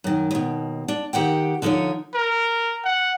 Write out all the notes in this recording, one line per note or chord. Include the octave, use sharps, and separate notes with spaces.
F#2 D#3
D#2 B2
D4
D#3 G4 F#5 G5
D3 F3 D#4 A#4 C#5
A#4
F#5